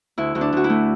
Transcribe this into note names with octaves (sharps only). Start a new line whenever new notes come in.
D2 E4
D2
D4
D2 F#4
E4
A3